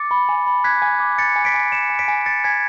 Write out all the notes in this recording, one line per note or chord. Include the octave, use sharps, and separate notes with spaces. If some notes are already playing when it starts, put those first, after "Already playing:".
Already playing: D6 A6 C#7
B5
G#5
B5
F#6 G#6 B6
G#5
D6
G#5 A6 C#7
G#5
B6 D7
G#5
G#5 C#7 E7
G#5
B6 D7
G#5
G#5 A6 C#7
G#5 G#6 B6